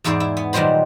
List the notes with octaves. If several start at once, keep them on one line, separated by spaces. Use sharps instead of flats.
E2 G#2 E4 G#4 D5
E4
B3
A#2 D#3 F#3 G3 C5 B5